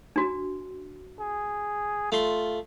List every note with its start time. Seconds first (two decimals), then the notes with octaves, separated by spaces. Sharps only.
0.16 D4 F#4
1.20 G#4
2.12 A3 F4 C6